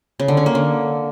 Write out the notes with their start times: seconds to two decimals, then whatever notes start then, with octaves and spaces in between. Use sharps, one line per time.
0.20 C#3
0.28 D3
0.37 C#4
0.46 A#3
0.55 D3